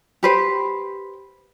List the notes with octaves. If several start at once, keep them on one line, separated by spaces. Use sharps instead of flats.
G4 B4 C5